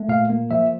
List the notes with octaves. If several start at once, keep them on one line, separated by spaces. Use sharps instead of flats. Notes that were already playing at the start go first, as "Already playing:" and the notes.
Already playing: A3
A#2 F5
A#3
F3 E5